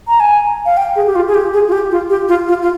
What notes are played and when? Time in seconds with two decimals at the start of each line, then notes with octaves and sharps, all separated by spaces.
0.08 A#5
0.20 G#5
0.66 F5
0.77 G5
0.96 G#4
1.06 G4
1.15 F4
1.28 G#4
1.34 G4
1.54 G#4
1.68 F4
1.72 G4
1.91 F4
2.10 G4
2.28 F4
2.48 F4
2.62 F4